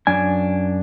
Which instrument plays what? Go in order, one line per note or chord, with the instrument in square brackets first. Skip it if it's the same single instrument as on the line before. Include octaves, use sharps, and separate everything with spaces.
[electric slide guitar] F#2 D4 G#5